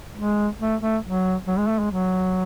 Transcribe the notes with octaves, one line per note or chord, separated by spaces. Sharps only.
G#3
A3
A3
F#3
F#3
G#3
A3
G#3
F#3